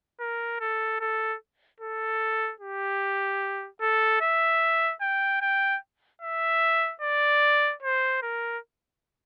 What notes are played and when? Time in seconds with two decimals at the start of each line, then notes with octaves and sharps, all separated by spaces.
0.20 A#4
0.60 A4
1.00 A4
1.80 A4
2.60 G4
3.81 A4
4.21 E5
5.01 G5
5.42 G5
6.22 E5
7.02 D5
7.82 C5
8.22 A#4